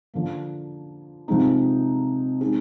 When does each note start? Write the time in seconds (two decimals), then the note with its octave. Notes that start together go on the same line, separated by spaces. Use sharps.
0.14 D3 F3 A#3
1.28 C3 F3 G#3 C4 D#4
2.41 G#3 C4 D#4 G#4